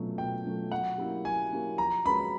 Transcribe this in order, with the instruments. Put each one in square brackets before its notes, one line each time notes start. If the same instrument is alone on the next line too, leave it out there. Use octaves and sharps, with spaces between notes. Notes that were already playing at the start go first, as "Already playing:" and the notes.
Already playing: [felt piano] B2 F#3 A3 C#4 F4
[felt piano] B2 [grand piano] G5
[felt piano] F#3 A3 C#4 F4
[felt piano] F#3 [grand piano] F#5
[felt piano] A#3 C#4 E4 G4
[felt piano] F#3 [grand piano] G#5
[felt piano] A#3 C#4 E4 G4
[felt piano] F3 [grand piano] A#5
[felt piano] G#3 C#4 F#4 B4 [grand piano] B5